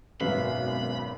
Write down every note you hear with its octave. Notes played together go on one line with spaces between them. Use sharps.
G#1 F#2 B2 B4 E5 F5 B5